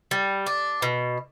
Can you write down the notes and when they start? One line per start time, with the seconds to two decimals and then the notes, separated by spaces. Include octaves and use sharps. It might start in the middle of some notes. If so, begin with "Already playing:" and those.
0.11 G3
0.46 D4
0.82 B2